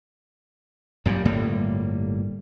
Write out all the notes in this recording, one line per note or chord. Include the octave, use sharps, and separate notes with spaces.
F#2 A#2 F#3 G3
G1 A2 G3 A#3